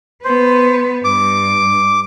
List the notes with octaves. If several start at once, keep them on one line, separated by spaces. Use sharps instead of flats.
B3 B4 C5
G2 D6